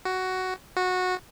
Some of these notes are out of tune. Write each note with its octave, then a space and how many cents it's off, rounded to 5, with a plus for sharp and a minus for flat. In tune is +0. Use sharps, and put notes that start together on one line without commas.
F#4 +10
F#4 -15